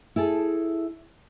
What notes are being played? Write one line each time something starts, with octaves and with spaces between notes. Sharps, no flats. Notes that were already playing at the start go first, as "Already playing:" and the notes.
E4 G#4 A4